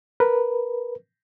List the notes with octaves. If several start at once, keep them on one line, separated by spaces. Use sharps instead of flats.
A#4 B4